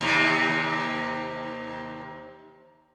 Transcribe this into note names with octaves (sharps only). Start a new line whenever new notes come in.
D#2 C3